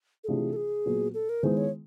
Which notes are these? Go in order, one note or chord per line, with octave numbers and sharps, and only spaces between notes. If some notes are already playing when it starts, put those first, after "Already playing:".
A4
C3 E3 A3 D4 F4 G#4
A4
G#4
A#2 F#3 B3
A4
A#4
D#3 G#3 B3 E4 G#4 C5
C#5